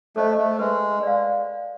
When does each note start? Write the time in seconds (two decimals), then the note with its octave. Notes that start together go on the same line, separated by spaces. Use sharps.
0.16 A3 A4 C5 D#5
0.38 A3
0.59 G#3 B4
1.03 D5 F5